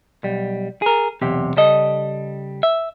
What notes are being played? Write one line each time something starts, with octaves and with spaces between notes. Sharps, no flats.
B1 G3
G#4 A#4
B1 E2 C3 G4
C#3 G3 A4 D#5
E5